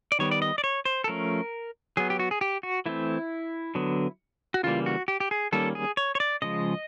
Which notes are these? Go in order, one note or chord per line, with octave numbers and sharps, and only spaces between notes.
D5
D#3 G3 B3 C#5
D5
D#5
D5
C#5
C5
A4
F3 A3 C#4 A#4
F#3 B3 G#4
G4
F#4
G#4
G4
F#4
E3 A3 C4 E4
D3 F#3 B3
F#4
C#3 E3 G3 A#3 F4
F#4
G4
G4
G#4
D#3 G3 A#3 C#4 A4
G#4
C#5
C#5
D5
C#3 F3 G#3 D#5